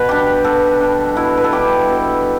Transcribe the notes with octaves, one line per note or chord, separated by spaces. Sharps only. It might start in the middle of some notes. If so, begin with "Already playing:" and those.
Already playing: B2 B4
G3 D4 G4
B2 A4
G3 D4
B2 E4
B4
A4
G3 D4 G4
B2